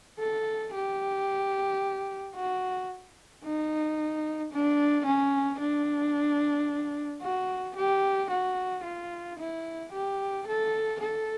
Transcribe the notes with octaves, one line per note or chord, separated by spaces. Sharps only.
A4
G4
F#4
D#4
D4
C#4
D4
F#4
G4
F#4
F4
E4
G4
A4
A4